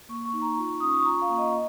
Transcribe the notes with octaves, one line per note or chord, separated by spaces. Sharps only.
A#3 C#6
C#6
D#4
A#5
F4 C#6
C#4 D#6
C#6
C#6
F4 A#5
F5
A#3
D#5
D#5